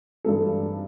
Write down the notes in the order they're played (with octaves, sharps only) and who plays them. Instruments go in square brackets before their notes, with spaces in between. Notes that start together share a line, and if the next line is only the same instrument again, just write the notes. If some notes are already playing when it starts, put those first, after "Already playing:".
[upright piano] G2 E3 G#3 C4 D#4 A4